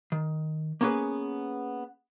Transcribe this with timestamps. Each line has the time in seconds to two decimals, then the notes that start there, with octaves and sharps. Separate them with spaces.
0.12 D#3
0.81 A#3 B3 C#4 G#4 B4